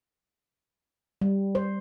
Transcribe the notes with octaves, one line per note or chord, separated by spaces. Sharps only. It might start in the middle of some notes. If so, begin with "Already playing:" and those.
G3
C5